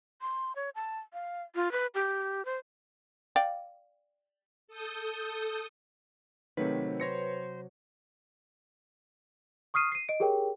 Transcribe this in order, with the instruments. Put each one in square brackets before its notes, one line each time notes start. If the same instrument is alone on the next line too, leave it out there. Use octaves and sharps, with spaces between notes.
[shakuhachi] C6
C#5
A5
F5
F4
B4
G4
C5
[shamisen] D5 F5 G5
[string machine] A4 D#6 G6
[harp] C3 F#3 [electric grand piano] D#3 A3 C4 [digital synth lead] B4
[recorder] C5 [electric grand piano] C#5 A#6 C#7
[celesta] C#6 D#6 F6 C7 D#7
C7 D#7
D#5 D7
G4 G#4 A#4 C#5 G5